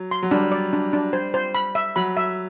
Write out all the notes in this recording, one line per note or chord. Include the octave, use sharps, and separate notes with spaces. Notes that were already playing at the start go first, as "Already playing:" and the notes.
Already playing: F#3
C6
F#3
G3 D4
D5
D4
D4
C5
C5
B5
E5
F#3 B5
E5